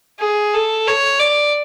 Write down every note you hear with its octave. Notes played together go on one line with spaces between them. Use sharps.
G#4
A4
C#5
D5